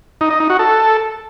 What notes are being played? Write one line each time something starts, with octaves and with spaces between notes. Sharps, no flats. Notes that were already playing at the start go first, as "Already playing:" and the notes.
D#4
D#5
D#4
F#4
A4